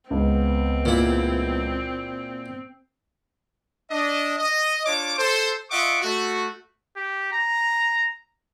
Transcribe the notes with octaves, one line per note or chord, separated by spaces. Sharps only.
C#2 B3 C4
A#2 E4
D4 D#5
D#5
D4 F4 C#5 D6
A4 C5
F4 D#5 E5 F#5 C#6 D6
A3 F#4
G4
A#5